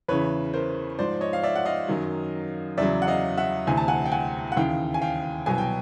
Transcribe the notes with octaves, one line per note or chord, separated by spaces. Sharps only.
E2 C#3 E3 B4 C#5
A#4 C5
G#2 F3 C5 D5
C#5 D#5
F5
D5 E5
F#5
D#5 F5
F#2 D#3 F#3
E2 C#3 F#3 D5 E5
F#5
D#5 F5
E5 F#5
D2 C3 E3 G#5
A5
F#5 G#5
G5
F#5 G#5
F#5
D#2 C#3 E3 F5 G5
G#5
F5 G5
C2 B2 F#3 G#5
G5